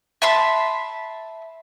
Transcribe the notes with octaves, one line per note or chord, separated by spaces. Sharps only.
E5 A5 B5 C6